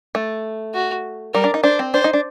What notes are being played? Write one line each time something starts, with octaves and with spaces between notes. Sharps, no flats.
A3
F#4
G3 A#4
D4
D#4
D4 C5
C4
D4 C5
D#4
D4